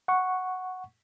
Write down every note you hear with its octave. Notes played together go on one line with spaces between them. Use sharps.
F#5 C#6